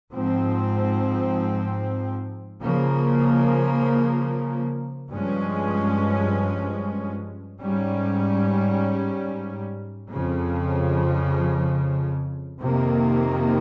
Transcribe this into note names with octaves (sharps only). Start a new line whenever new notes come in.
G#2 F3 C4
C#3 F3 A#3
G2 F3 G#3 C#4
G#2 G3 C#4
F2 C#3 F3
F2 C3 D#3 A#3